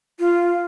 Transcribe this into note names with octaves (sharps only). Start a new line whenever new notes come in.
F4